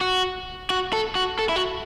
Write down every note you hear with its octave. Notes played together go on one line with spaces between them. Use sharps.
F#4
F#4
A4
F#4
A4
E4
F#4